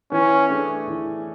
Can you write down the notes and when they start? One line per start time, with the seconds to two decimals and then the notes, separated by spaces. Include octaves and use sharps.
0.12 E3 C#4
0.49 A3 D4 G#4
0.88 E3